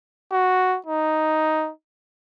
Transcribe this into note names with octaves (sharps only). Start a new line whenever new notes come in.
F#4
D#4